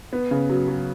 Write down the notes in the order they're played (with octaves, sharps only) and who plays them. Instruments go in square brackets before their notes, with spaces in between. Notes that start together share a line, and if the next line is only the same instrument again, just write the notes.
[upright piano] B3
C#3
F#3
F#3